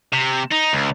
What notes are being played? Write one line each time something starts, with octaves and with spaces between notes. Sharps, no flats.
C3
D#4
C#2